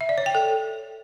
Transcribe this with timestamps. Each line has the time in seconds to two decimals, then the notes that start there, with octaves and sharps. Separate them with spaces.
0.01 E5
0.09 D5
0.18 C#5
0.26 G5
0.35 A4